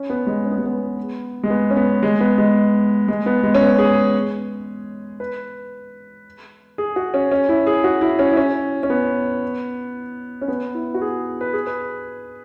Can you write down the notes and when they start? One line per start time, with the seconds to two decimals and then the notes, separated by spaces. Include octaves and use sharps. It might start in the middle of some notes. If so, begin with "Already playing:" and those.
Already playing: C#4
0.10 B3
0.27 G#3
0.45 C#4
0.52 B3
0.58 G#3
0.66 B3
1.44 G#3
1.50 B3
1.70 C#4
1.76 B3
2.03 G#3
2.20 B3
2.38 G#3
3.08 G#3
3.26 B3
3.43 G#3
3.55 C#4
3.62 B3
3.78 G#4
5.20 B4
6.78 G#4
6.96 F#4
7.14 C#4
7.32 C#4
7.49 E4
7.67 G#4
7.84 F#4
8.01 E4
8.19 C#4
8.32 E4
8.37 C#4
8.83 C#4
8.90 B3
10.41 C#4
10.48 B3
10.74 E4
10.94 F#4
11.02 G#4
11.41 B4
11.53 G#4
11.67 B4